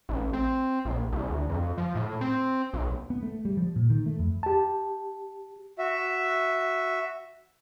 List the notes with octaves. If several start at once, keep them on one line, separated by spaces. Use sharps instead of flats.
A1
C4
A#1
C2
D2
F2
F3
A2
C4
B1
B3
A3
G3
F3
A#2
D#3
A3
F2
G4 A5
F#4 E5